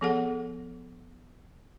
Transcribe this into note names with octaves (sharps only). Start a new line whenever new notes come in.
F3 B3 G#4 A4 F#5